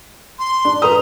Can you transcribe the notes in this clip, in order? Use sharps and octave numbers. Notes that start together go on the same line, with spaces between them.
C6
D4
B4 A#5 D#6